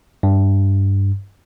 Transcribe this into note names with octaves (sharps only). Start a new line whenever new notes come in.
G2